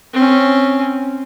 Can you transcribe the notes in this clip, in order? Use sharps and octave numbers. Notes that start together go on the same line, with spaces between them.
C4 C#4